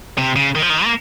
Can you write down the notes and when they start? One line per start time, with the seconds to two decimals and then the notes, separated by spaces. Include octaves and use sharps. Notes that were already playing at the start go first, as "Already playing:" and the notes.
0.18 C3
0.36 C#3
0.55 D#3
0.62 F3
0.70 D#3
0.84 A#3